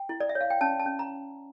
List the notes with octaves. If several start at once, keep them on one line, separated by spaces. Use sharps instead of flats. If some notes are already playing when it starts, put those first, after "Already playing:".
Already playing: G5
E4
D5
E5
C#5
F5
G5
C#4 A5
A5
C#4
A#5